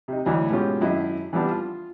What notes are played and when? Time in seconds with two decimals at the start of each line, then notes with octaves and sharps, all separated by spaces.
0.08 C3 D#4
0.25 D2 E3 F#3 D#5
0.50 G#2 B2 C#4 F4 G4
0.81 G#1 F#2 E4 D#5
1.33 E3 F3 G3 B3 D4
1.51 F4